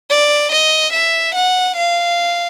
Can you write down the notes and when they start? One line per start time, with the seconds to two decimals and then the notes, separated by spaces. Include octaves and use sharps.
0.10 D5
0.52 D#5
0.93 E5
1.35 F#5
1.76 F5